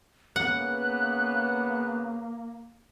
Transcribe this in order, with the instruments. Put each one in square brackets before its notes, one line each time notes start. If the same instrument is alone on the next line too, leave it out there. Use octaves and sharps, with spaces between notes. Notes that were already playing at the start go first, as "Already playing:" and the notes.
[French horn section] C#3 B3 [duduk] A#3 [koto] F#5 [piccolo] F#6